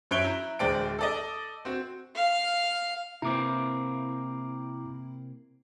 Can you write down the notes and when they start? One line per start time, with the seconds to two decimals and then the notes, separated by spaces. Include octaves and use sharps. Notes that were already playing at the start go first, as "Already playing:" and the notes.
0.11 F#2 C#5 E5 F#6 D7 G7
0.24 E4 A#5
0.59 D1 G#3 C5 D5 G5 D7
0.99 A4 D5 D#5
1.65 C4 F#4
2.15 F5
3.22 C3 A#3 C4 E4 A#5 D6